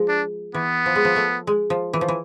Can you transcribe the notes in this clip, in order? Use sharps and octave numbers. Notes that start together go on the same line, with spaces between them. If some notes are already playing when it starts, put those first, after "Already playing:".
Already playing: F3 G#3
D4
E3 B3
F3
G#3
F3
A3
G#3
F3
E3
F3
E3